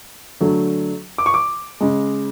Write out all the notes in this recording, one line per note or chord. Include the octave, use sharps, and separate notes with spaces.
D3 F#3 A3
D6
C#6
D6
C#3 G#3